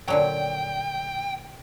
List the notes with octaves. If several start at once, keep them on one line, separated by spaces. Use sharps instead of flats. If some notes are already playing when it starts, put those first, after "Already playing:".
A#2 D3 F#3 G5